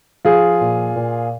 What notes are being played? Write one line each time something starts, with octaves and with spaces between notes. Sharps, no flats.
F3 F4 G#4
A#2
A#2